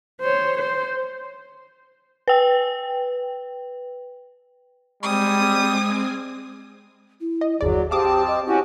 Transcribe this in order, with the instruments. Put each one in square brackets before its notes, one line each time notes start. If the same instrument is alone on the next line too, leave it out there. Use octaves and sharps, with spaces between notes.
[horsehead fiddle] C5 C#5
C5
[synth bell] B4 G5
[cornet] G3 [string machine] G#3 C4 G#5 [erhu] D#6
[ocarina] E4
[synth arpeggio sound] D#5
[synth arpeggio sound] G1 D#2 D5 [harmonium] F#3 [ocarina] G#4
[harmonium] C4 A5 [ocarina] G4 [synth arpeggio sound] F5 D6 D#6
[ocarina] D#5
[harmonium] C#4 F#4 G4 [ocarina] E4